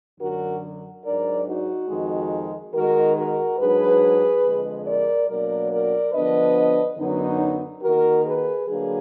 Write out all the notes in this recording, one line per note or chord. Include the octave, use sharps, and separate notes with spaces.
F#2 D3 F#3 D4 F#4 A#4
G#2 F#3 D4 A#4 D5
D#4 F#4
F2 D#3 G#3 D#4
D#3 G#3 D#4 F#4 A#4
F#4 A#4
G#2 F#3 D4 G#4 B4
F2 D3 G#3
A#4 D5
B2 F#3 A#3 D4 A#4 D5
A#4 D5
D3 F3 B3 D4 B4 D#5
F#2 D3 F#3 B3 D#4
D#3 A#3 D#4 F#4 A#4
G#4 B4
D3 F#3 A#3 D4 G#4 B4